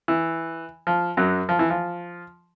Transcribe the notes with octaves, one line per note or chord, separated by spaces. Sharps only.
E3
F3
F#2 F#3
F3
E3
F3